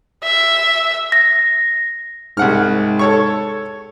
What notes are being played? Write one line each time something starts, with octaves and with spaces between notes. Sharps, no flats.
E5
A#6
C2 G#2 F#5 F6
A4 C#5 C#6